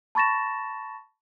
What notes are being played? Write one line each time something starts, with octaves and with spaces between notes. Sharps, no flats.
A5 B5 C#6 A6 A#6 E7